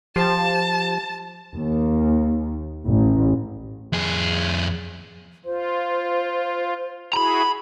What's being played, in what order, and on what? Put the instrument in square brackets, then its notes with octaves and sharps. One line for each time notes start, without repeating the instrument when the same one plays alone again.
[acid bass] F3 [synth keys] G4 C5 [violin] A5
[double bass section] D#2
A1
[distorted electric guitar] F2 G#4
[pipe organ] F4 [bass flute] C5
[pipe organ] E4 F#4 G#4 [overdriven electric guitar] A#5 B5